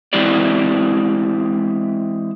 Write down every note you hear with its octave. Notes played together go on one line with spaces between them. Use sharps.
E3 G#3 C4 E4 G4 D5